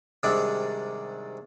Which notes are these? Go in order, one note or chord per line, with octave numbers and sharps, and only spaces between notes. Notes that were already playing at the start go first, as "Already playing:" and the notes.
G#2 C3 D#3 G3 C4 D4